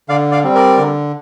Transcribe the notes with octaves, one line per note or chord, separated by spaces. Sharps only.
D3 D5 F5
D5 F5
G3 C4
A#4 D5
D3